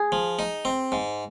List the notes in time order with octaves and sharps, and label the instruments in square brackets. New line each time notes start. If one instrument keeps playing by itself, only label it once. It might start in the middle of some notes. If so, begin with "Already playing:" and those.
Already playing: [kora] G#4
[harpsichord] F3
D#4
C4
G#2